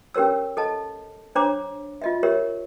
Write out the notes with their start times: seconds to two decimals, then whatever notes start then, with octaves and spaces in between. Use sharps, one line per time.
0.14 C#4 G4 A#4 C#5 E6
0.57 A4 D#5 A5
1.35 D4 C5 C#5 A#5 D6
2.02 F4 D#5 E5
2.23 G4 A#4 C#5 E5